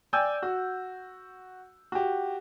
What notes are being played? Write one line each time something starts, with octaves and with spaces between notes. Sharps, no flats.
D5 G5 G#5 E6 G6
F#4
F#4 G4